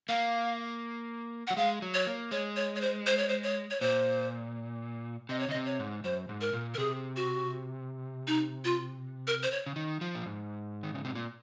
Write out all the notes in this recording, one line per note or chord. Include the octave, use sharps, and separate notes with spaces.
A#3 F5
F#3 F#5
G#3 F5
F#3
C#5
A#3
G#3 C#5
C#5
C#5
C5
C5
C#5
C5
C#5
C#5
A#2 C5
C3 D#5
C#5
C#3 D#5
C3
C#5
G#2
F#2 C5
G#2
A#4
A#2
A#4
C3 G#4
F#4
D#4
F4
A#4
C5
C#5
C#3
D#3
F3
A#2
G#2
D#3
C#3
C3
A#2